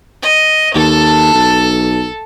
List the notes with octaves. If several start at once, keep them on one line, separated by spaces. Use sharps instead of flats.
D#5
D#2 A4 A5
B1